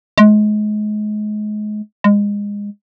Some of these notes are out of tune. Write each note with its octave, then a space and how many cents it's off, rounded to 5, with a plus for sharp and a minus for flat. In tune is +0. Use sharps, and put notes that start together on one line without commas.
G#3 +30
G#3 -25